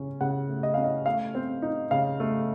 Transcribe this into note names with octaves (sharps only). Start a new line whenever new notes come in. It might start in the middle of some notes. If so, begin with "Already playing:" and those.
Already playing: C#3 C#4
C#3 F#5
A3
D#5
C#4 F5
D#5
A3 F5
C4
D#4
C#3 F5
A3